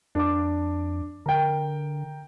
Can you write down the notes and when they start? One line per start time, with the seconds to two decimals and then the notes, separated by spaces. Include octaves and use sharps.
0.15 F2 D4 D6
1.26 D3 A#4 G5